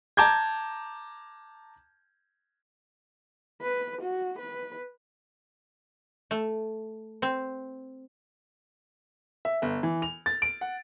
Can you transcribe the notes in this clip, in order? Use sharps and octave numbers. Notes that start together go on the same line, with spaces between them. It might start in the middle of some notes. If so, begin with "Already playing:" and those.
A5 A#5 D6 G6 G#6
B4
F#4
B4
A3
C4
E5
G1
E3
F7
A6
D7
F#5